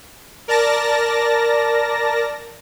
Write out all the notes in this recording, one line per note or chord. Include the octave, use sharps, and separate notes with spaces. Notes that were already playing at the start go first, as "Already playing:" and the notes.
A#4 D5 A5 A#6